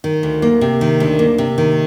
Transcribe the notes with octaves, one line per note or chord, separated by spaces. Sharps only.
D#3
D2
A#3
C3
D#3
D2
A#3
C3
D#3